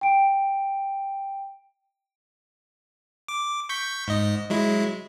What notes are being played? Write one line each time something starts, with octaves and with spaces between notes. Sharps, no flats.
G5 D7
D6
C#6 G6 B6
G#2 D#5
F#3 G#3 E4